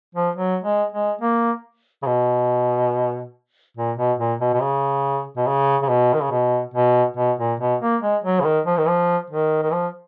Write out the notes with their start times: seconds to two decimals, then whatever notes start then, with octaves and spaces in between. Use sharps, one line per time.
0.15 F3
0.36 F#3
0.64 G#3
0.92 G#3
1.22 A#3
2.03 C#3
2.07 B2
3.77 A#2
3.98 B2
4.19 A#2
4.41 B2
4.54 B2
4.62 C#3
5.37 B2
5.47 C#3
5.83 C#3
5.89 B2
6.14 D#3
6.23 C#3
6.31 B2
6.74 B2
7.17 B2
7.39 A#2
7.60 B2
7.81 A#3
8.02 G#3
8.24 F#3
8.40 C#3
8.45 D#3
8.66 F3
8.77 D#3
8.88 F3
9.30 D#3
9.62 D#3
9.72 F3